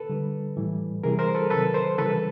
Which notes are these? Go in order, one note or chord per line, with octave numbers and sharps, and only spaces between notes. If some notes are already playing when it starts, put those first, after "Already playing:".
Already playing: A4 B4
D3 G3
A2 E3 G3
C3 E3 G3 G#4 A#4
A#4 C5
A4 B4
C3 D#3 F#3 A4 B4
A#4 C5
C#3 E3 G3 A4 B4